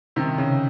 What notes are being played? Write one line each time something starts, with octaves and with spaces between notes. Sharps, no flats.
C3 D#3
C#3